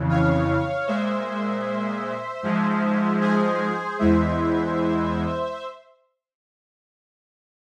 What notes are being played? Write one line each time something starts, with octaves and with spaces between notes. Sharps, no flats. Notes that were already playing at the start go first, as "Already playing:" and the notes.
Already playing: F2 C#3 E3
C#5 F5
A#2 G#3 C5 E5
G#2 F3 G#3
G#4 C5
E2 E3 G#3 C5 E5